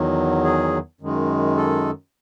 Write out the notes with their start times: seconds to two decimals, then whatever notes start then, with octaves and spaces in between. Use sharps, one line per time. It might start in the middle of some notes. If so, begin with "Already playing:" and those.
Already playing: E2 D#3 F#3
0.44 G#4
1.01 F#2 D#3 G#3
1.57 A4